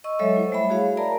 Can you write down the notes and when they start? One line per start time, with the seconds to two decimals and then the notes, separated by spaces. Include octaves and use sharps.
0.04 D#5 C#6 E6
0.19 F#3 G#3 A4 C#5 E5
0.36 E4 C5
0.52 G3 A3 E5 B5
0.70 F#4 G#4 C#5 F5
0.97 A#4 D5 A5 A#5